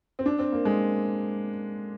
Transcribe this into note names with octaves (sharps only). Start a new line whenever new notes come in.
C4
D4
C4
A#3
G#3